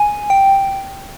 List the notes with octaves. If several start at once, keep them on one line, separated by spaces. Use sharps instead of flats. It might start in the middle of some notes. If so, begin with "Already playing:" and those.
Already playing: G#5
G5